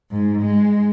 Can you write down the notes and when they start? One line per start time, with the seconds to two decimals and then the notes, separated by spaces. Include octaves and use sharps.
0.11 G#2
0.42 G#3